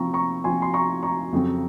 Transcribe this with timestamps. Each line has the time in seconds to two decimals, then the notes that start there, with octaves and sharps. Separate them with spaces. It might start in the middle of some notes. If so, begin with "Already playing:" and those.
Already playing: C3 F3 C4 A#5 C#6
0.13 A#5 C#6
0.44 C3 F3 C4 G#5 C6
0.62 C6
0.73 A#5 C#6
1.03 A#5 C#6
1.32 F2 C#3 F#3 C4